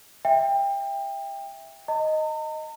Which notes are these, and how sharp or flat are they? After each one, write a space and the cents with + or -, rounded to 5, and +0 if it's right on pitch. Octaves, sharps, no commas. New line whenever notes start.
E5 +0 G5 +25
D#5 +0 A#5 -45